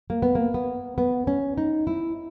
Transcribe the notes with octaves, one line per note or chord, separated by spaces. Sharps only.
A#3
B3
A#3
B3
B3
C#4
D#4
E4